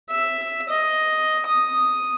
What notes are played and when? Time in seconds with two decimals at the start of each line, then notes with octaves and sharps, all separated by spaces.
0.10 E5
0.69 D#5
1.47 D#6